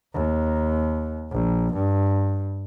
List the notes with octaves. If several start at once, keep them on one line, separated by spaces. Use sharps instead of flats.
D#2
A#1
G2